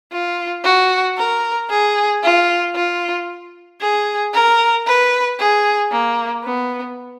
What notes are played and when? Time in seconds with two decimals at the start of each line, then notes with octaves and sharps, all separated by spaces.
0.12 F4
0.64 F#4
1.17 A#4
1.70 G#4
2.23 F4
2.75 F4
3.81 G#4
4.33 A#4
4.86 B4
5.39 G#4
5.91 A#3
6.44 B3